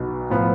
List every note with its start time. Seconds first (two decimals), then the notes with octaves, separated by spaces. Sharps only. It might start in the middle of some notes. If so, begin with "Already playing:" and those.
Already playing: B1 B2 B3
0.30 A2 F3 B3